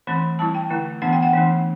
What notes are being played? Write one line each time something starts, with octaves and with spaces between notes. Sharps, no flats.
E3 A3 C4 B5
G3 C4 E4 A5
G5
D3 A3 E4
E3 B3 D4 F#5
G5
F#5
E3 A3 D4